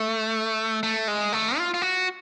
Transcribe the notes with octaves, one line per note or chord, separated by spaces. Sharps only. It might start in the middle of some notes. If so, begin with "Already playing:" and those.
Already playing: A3
A3
G#3
A3
F4
F4
F#4